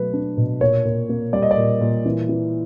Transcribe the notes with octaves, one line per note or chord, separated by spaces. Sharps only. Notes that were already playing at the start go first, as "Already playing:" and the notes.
Already playing: B2 F#3 A3 B4
D4
B2
A#2 C#5
A#2
A#3
G3 D5
D#5
D5
A#2
A#2
E3
E3